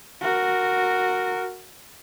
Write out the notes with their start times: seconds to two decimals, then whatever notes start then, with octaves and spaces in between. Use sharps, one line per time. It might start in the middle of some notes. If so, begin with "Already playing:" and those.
0.21 F#4 A#4